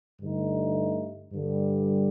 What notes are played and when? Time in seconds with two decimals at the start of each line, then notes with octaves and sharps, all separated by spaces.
0.21 G2 D3 A3 D#4
1.33 G2 D3 G3